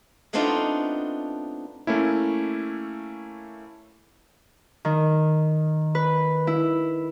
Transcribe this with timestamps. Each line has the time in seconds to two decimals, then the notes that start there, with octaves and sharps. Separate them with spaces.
0.33 A3 B3 C4 D4 D#4 F4
1.87 A3 A#3 C#4 E4
4.85 D#3
5.95 B4
6.47 E4